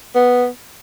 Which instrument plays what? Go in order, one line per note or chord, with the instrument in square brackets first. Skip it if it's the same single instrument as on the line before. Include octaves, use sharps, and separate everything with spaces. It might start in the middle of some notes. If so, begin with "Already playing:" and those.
[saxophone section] B3